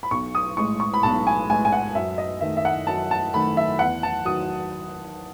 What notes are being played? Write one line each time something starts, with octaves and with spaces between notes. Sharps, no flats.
B5
B1 C#6
D#6
A2 G#3 C#6
C#6
B5
B1 A5
G#5
A2 G#3 G#5
G#5
F#5
F#2 E5
D#5
D#3 A3 E5
E5
F#5
F#2 A5
A5
D#3 A3 B5
E5
E2 F#5
A5
D#3 F#3 D#6